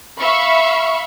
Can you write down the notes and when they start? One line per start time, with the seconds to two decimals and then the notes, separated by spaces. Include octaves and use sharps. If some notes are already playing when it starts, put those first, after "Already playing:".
0.19 E5 F5 B5 C#6